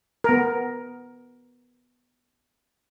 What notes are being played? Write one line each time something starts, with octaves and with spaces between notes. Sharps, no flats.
B3 A#4